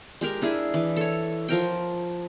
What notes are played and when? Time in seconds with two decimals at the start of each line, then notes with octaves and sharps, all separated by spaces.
0.21 G#3 G4 A#4
0.42 D4 E4 G#4
0.74 E3
0.96 A4 C#5
1.48 F3 A#4 G5